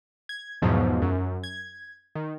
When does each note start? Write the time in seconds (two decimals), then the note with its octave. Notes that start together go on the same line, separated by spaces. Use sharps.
0.29 G#6
0.62 E2 G#2 B2 F3 F#3
1.02 F#2
1.44 G#6
2.15 D#3